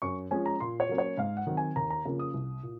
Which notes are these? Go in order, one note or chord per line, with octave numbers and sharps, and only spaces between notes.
F#2 C#6
F3 G#3 C#4 G#5
A#5
A#2 C6
C#5
F#3 A#3 C#4
C#5
G#2 F5
F#5
D#3 F#3 C4
G#5
D#2 A#5
A#5
C#3 F3 A#3
D#6
C2
A#2